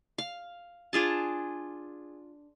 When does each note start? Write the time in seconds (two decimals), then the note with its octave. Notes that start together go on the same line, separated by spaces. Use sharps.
0.18 F5
0.93 D4 F4 G#4 A5